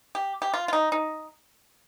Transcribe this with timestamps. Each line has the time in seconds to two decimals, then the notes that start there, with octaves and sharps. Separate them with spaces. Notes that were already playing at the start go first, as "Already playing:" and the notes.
0.15 G4
0.42 G4
0.54 F4
0.68 F4
0.73 D#4
0.92 D#4